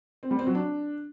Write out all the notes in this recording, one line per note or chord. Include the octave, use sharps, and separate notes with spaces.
C4
G3
C4
F#3
D4